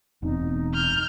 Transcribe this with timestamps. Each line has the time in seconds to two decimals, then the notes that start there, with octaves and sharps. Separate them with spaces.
0.22 E1 B3 C4 D#4
0.74 F6 G6